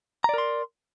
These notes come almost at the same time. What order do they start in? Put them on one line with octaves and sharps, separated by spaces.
A#5 D5 A#4 C6